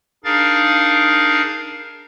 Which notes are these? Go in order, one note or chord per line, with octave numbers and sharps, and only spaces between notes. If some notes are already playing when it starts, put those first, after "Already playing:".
D4 D#4 G#4 A#4 F5 A6